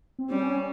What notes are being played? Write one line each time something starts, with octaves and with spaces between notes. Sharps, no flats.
C4
G3 C#4